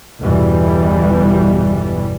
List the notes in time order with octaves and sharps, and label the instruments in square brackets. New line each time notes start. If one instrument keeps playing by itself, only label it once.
[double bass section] G1 E2 B2 E3 G3